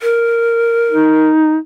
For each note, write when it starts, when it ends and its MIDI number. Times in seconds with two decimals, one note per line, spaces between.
0.01 1.29 70
0.91 1.57 63